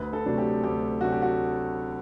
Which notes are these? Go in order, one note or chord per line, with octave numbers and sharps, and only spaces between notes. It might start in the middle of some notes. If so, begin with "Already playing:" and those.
Already playing: D2 B4
A4
C3 F#3 A3 D4
G4
D2 G4
C3 F#3 A3 D4 F#4
G4
F#4